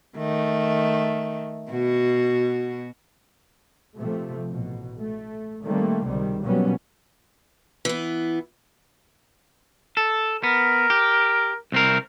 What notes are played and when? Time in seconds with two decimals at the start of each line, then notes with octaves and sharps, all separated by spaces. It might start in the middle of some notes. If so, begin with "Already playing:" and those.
0.17 D#3 A3
1.70 B2 F#4
3.98 C3 F3 A3
4.52 A1 B2
5.00 A3
5.63 D#3 G3 A3 A#3 C4
6.06 C#2 C3 D#3 G3
6.42 B2 F#3 G3 A#3 B3 C#4
7.85 E3 B3
9.97 A4
10.43 B3 A#4
10.90 G4
11.72 C2 C4 A#4